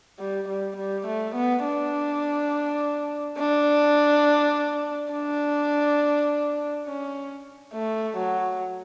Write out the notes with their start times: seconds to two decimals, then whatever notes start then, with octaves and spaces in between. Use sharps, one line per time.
0.19 G3
0.48 G3
0.77 G3
1.07 A3
1.35 B3
1.64 D4
3.38 D4
5.13 D4
6.87 C#4
7.73 A3
8.17 F#3